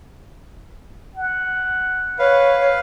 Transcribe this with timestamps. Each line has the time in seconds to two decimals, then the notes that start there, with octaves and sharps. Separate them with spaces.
1.15 F#5
2.19 B4 C#5 F5